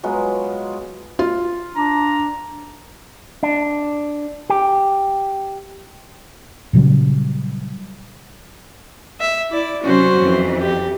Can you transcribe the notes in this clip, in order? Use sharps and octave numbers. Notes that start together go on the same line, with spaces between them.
F#3 G#3 B3 F4
F4
D4 A#5
D4
G4
A#2 C#3 F#3 G3
E5
E4 D5
C3 F#3 C#4 F#4 C5
F2 E3
G4